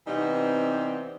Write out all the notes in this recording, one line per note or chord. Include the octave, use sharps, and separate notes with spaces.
C3 E3 G3 B3 C4 D#4